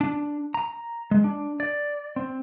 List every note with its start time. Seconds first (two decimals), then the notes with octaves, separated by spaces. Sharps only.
0.01 D4
0.54 A#5
1.11 G#3
1.24 D4
1.60 D5
2.16 C4